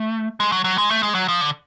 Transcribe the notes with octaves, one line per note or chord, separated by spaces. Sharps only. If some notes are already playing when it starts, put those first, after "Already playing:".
Already playing: A3
G#3
F#3
F#3
G#3
A3
G#3
F#3
F3
D3